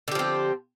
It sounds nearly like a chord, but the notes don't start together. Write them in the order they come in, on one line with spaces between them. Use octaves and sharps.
D3 G4 F3 C4